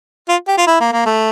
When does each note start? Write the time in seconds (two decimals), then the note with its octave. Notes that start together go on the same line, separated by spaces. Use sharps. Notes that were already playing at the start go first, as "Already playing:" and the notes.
0.29 F4
0.48 G4
0.58 F4
0.67 E4
0.80 A#3
0.93 A#3
1.06 A3